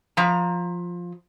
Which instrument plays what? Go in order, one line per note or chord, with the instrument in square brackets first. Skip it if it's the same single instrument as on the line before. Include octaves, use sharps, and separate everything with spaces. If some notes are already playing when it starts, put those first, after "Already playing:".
[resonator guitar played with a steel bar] F3 A#5